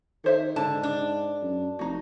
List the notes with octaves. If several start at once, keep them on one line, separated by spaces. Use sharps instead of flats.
D#3 A4 C5 E5
G#2 D3 A5
D4
F#2
F1 D#4 F#4